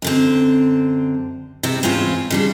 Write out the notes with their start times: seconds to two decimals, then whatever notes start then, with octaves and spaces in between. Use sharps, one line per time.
0.02 F#2 D3 C4
1.63 C3 G3 C4
1.83 E2 G#2 C4 C#4 F4
2.30 C#3 G3 D4